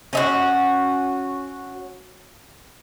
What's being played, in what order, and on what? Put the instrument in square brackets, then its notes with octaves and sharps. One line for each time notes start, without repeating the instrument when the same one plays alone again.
[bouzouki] C#4 D#4 F#4